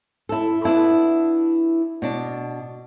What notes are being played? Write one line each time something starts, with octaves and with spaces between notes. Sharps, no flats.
E4 A4
B3 D4 E4 A5
B2 D4